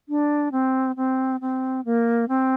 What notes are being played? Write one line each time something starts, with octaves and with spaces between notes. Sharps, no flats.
D4
C4
C4
C4
A#3
C4